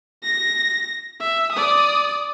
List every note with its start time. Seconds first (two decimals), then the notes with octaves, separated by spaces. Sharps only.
0.23 A#6
1.20 E5
1.52 D5 D#6